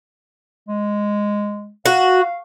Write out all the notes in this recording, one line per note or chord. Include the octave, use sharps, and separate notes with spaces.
G#3
F#4 F5